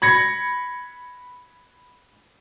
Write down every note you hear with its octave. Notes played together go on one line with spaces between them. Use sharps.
B5 G#6 A#6 C#7